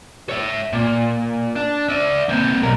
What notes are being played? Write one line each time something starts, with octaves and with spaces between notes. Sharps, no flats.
C#5 E5
A#2
D4
D5 E5
A#3 C4
B1 A#4